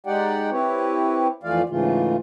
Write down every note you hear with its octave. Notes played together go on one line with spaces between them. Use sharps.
G#3 D#4 G4 D5 F#5 G5
C4 E4 G4 B4 C#5
F2 E3 A3 F4 D5 F5
G#2 C#3 E3 A3 F4